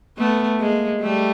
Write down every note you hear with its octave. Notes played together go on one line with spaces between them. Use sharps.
A3 B3
G#3 A#3
G3 A3